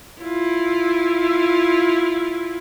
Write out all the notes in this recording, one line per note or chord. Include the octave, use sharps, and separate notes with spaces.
E4 F4